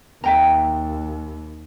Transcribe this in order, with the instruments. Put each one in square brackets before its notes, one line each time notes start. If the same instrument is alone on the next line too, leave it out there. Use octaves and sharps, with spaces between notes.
[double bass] D#2 [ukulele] E5 G5 A#5